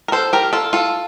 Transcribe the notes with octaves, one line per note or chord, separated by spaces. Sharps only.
A#4
A4 C5
G4 A#4
F4 A4
F4 A4